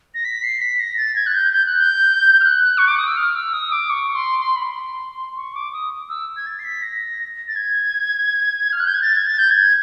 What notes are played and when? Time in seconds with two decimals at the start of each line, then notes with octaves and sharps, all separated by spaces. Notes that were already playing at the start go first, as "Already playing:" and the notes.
0.14 A#6
0.25 B6
0.43 C7
0.61 B6
0.80 A#6
0.98 A6
1.16 G#6
1.27 F#6
1.34 G6
1.52 G6
1.66 F#6
1.80 G6
2.40 F6
2.44 F#6
2.78 C#6
2.88 D6
2.98 D#6
3.07 E6
3.17 F6
3.35 E6
3.53 D#6
3.72 D6
3.90 C#6
4.15 C6
4.39 C6
4.56 B5
4.63 C6
5.36 C#6
5.55 D6
5.73 D#6
6.09 E6
6.37 G#6
6.46 A6
6.59 C7
6.64 B6
6.82 A#6
7.48 A6
7.56 G#6
8.73 F6
8.80 F#6
8.87 G6
8.94 G#6
9.02 A6
9.17 G#6
9.26 A6
9.39 G6
9.51 G#6